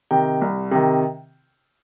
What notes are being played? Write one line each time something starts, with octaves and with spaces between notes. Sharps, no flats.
C3 D#3 G5
C2
C3 D#3